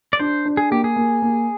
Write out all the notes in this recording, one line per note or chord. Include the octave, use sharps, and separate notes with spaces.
D5
D4 C5
D4
G#4
A#3 G4
G#4
A#3
A#3